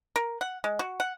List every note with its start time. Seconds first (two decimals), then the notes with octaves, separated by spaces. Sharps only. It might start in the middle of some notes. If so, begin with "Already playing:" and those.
0.16 A#4
0.41 F#5
0.64 G#3
0.79 F#4
1.00 F#5